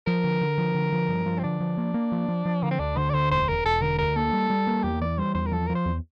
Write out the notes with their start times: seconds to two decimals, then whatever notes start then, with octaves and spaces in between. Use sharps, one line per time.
0.07 F3 A#4
0.24 D3
0.41 D3
0.58 F3
0.75 D3
0.92 F3
1.09 G2
1.26 F3
1.39 C4
1.43 D3 D4
1.60 F3
1.77 A#3
1.94 A#3
2.12 F3
2.28 F3
2.45 F3
2.63 D3 A#3
2.71 C4
2.79 D2 D4
2.97 D3 C5
3.09 D5
3.13 D2 C5
3.31 E1 C5
3.47 E1 A#4
3.64 E1 A4
3.81 D3 A#4
3.98 D2 A#4
4.16 A#3 A4
4.33 G3
4.50 G3
4.67 A#3
4.84 E2 G4
5.01 E3 D5
5.18 G3 C5
5.34 E2 C5
5.46 A#4
5.52 F3 A4
5.67 A#4
5.70 F3
5.75 C5
5.86 E2